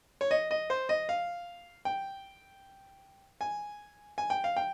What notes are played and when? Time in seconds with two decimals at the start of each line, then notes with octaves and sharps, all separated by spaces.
0.21 C#5
0.31 D#5
0.51 D#5
0.70 C5
0.89 D#5
1.09 F5
1.85 G5
3.41 G#5
4.18 G#5
4.30 G5
4.44 F5
4.57 G5